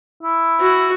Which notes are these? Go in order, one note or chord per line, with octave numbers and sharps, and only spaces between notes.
E4
F#4